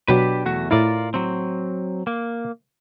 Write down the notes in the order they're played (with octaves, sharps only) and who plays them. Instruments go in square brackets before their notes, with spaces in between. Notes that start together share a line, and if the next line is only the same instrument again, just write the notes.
[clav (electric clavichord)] B2 F#3 [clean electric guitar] D4 G4 B4
[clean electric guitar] E2 A3 F#4
[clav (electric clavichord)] A2 E4 [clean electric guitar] F4 A#4 D5
[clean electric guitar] F#3 C4
A#3